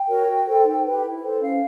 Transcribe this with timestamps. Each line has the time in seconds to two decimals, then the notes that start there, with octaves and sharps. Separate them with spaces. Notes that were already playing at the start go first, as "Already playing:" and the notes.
Already playing: G5
0.08 F#4 A#4 C#5
0.28 F#4
0.46 A4 C5
0.65 D#4
0.84 G4 B4
1.03 E4
1.22 A4 C5
1.40 C#4 F5